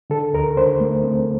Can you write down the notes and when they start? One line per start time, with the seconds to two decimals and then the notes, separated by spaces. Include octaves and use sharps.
0.10 D3 A4
0.33 D2 A#4
0.57 D3 C5
0.80 A3
1.04 C4